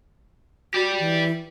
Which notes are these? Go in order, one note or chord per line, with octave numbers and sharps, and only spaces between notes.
F#4 G4 D5
E3